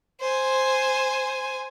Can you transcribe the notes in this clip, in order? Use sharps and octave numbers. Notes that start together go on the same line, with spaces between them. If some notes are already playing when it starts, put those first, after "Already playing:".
C5 G#5